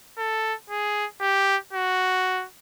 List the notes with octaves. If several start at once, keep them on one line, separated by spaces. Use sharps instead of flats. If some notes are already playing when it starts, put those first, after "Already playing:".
A4
G#4
G4
F#4